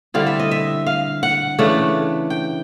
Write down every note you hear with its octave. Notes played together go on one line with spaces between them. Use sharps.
D3 G3 C4 E4 F5
E5
D#5
E5
F5
F#5
C#3 E3 A3 D4
G5